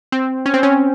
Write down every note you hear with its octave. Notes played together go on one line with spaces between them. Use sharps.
C4
C#4
C4
C#4